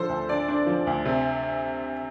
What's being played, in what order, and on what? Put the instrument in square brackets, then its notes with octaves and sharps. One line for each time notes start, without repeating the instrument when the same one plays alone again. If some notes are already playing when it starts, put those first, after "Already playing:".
Already playing: [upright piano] D3 F3 D4 [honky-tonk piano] A4 C5
[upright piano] D2
[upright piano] D3 [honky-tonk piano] D5
[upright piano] D4
F3
D2
C3